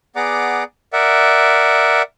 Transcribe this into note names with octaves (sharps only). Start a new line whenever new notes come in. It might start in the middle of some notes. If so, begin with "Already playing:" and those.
B3 G#4 D5 F#5 A#5 D6
A#4 D5 E5 F#5